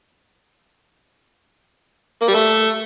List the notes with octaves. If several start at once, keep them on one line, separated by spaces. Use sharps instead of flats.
A#3
G3
A3